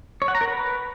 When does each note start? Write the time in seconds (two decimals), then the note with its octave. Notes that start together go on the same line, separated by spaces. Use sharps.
0.22 C#5
0.28 F#5
0.35 A#5
0.41 A#4
0.48 B4